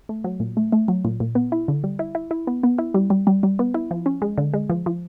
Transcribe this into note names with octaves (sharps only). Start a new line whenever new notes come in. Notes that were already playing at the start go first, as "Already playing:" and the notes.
A3
F#3
A#2
A3
A3
F#3
A#2
A#2
B3
E4
D3
G3
E4
E4
E4
B3
B3
E4
G3
G3
G3
G3
B3
E4
F3
C#4
G#3
D3
G#3
F3
F3